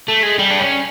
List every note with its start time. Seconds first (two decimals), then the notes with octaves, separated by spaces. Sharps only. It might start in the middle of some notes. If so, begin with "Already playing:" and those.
0.08 A3
0.23 G#3
0.39 G3
0.51 D4
0.60 C#4